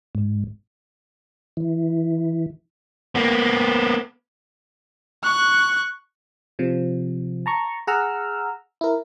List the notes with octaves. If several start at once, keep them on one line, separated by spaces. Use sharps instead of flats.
G#2
E3
A#3 B3
C#6 F#6
C3 F3
A5 A#5 C#6
G#4 F#5 A#5 E6 F6
E4 A#4